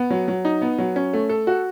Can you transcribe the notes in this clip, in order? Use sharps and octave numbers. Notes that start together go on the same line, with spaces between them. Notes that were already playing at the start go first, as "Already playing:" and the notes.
Already playing: B3
F#3
F#3
D#4
B3
F#3
C#4
A3
A4
F#4